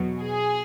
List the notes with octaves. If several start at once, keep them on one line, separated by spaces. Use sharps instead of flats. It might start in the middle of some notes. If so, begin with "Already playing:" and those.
Already playing: E2 B2 F#3
G#4